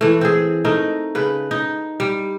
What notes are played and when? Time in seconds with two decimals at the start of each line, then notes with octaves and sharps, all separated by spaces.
0.01 E3 A3
0.21 C4 G#4
0.64 A3 D#4 A#4
1.15 C#3 B4
1.51 D#4
2.00 G3